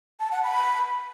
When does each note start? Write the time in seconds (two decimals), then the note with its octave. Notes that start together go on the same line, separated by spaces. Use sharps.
0.20 A5
0.31 F#5
0.43 B5